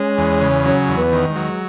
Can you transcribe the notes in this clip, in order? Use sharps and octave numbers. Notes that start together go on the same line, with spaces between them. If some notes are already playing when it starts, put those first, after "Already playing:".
Already playing: G#3 C#4
E2
C#3
F#3 C#4
E2
B3
D#3
G#3
F#3